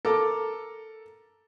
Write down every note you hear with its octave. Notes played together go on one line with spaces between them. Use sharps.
A4 A#4 A#5 D6